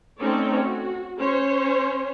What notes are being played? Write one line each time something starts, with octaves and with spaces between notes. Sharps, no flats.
A3 C4 C#4 D#4 C#5 D5
F#4
C#4 C5 C#5